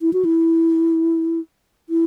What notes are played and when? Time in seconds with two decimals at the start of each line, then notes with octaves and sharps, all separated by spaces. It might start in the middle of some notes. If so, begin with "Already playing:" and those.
0.01 E4
0.13 F#4
0.25 E4
1.90 E4